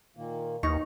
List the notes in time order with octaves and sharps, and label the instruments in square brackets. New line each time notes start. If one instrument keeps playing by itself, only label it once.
[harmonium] A#2 D#3 A#3
[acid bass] D#2 [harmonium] E3 [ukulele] D#4 [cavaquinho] C#6